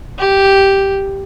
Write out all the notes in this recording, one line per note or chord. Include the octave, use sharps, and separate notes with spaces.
G4